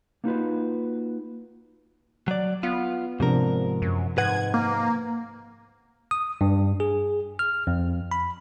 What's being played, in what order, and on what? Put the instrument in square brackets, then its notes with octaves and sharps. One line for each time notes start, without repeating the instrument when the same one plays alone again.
[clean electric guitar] A#3 B3 D#4 F4 F#4 B4
F#3 D5
[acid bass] B3 [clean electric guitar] F4
[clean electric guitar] G#2 A#4 [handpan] C3 F3 D4
[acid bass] F#2
[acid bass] G#2 [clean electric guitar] B4 F#5 [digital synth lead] G#6
[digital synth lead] A#3
[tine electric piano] D#6
G2
G#4
F6
F2
B5